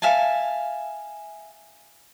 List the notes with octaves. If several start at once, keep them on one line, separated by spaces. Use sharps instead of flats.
E5 F5 G#5 A5